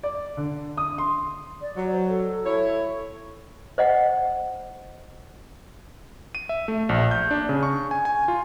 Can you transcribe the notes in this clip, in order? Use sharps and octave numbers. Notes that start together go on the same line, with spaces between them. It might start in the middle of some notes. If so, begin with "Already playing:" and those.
D5
D3
D#6
C6
D5
F#3
C5
A4
E4 C#5
C5 D#5 F#5
D#7
E5
A3
A#1
G6
D4
C#3
C#6
G#5
G#5
F4